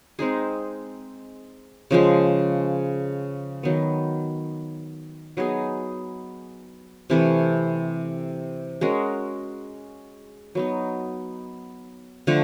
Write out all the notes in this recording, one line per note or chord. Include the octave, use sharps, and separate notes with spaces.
G#3 C4 D#4 G#4
C#3 F3 G#3
D#3 F#3 B3
F#3 B3 D#4 G#4
C3 E3 A3
G#3 C#4 F#4 A#4
F#3 B3 D#4
D3 F3 A3